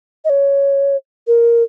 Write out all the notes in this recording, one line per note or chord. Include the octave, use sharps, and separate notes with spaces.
D#5
C#5
A#4